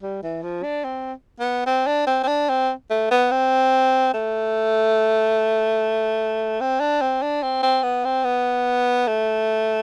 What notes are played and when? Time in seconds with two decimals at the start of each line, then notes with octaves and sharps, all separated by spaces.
0.02 G3
0.23 E3
0.43 F3
0.63 D4
0.84 C4
1.40 B3
1.66 C4
1.87 D4
2.07 C4
2.24 C4
2.28 D4
2.49 C4
2.90 A3
3.11 B3
3.31 C4
4.14 A3
6.61 C4
6.80 D4
7.01 C4
7.22 D4
7.43 C4
7.62 C4
7.83 B3
8.05 C4
8.24 B3
9.08 A3